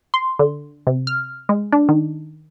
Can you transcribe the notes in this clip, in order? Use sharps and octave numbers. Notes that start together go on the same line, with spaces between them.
C6
D3
C3
F6
G#3
D4
D#3